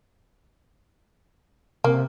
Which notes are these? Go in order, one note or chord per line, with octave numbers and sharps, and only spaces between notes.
C3 A#3